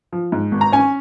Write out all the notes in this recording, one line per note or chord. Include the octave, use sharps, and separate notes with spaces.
F3
G#2
G#1
A#5
C#4 G#5